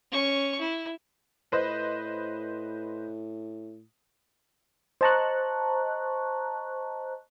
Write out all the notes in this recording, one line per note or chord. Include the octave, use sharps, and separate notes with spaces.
C#4 C#6
E4
A2 B4 C5 D#5
C5 D#5 A5 A#5 C#6 F#6